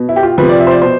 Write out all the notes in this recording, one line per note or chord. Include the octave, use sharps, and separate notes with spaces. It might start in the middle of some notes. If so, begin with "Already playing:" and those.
Already playing: B2
E4
G4
F4
C3 F3 B4
D5
E5
C5
D5
B2 C5